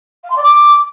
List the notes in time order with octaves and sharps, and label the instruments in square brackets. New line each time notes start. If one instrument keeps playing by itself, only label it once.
[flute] F5
C6
D5
D6